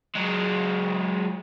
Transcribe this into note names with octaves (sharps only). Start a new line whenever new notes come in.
F#3 G#3